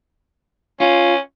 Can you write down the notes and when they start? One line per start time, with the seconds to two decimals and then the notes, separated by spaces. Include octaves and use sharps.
0.80 C#4 F4